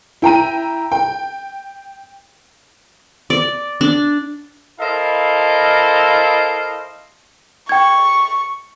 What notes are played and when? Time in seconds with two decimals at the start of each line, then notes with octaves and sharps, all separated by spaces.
0.22 E4 G5 A#5 D#7
0.92 G5
3.30 D5
3.81 D4
4.80 E4 A4 A#4 C5 D#5 F5
7.69 G5 C#6 G#6